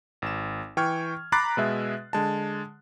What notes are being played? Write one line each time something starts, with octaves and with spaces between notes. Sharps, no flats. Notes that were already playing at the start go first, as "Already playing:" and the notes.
G#1 E7
E3 G5 C#6 F6 G#6
A#5 B5 D6 F#6 A6 C7
B2 G#3 E5
D3 G#3 A5